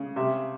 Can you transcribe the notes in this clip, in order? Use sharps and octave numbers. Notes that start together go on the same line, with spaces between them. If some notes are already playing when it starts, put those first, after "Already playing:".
Already playing: C#3
C3 E5